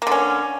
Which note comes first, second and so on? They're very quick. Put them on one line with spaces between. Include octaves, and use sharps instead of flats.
A#3 D3 C#4